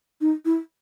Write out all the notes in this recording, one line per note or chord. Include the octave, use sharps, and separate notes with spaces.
D#4
E4